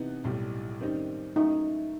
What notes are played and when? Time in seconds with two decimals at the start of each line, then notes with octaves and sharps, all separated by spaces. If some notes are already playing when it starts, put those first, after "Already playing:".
Already playing: C3 E3 B3 D#4
0.24 B1 A2 G3
0.80 F#2 D#3 G3 C4 D#4
1.36 F#2 F#3 A3 D#4 E4